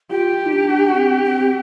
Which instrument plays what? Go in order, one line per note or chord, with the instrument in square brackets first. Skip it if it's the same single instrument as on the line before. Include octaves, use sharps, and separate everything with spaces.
[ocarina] F4 [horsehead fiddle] G4
[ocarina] D#4
D4
C4
C4